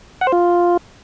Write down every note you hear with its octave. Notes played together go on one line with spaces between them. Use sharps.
F#5
C5
F4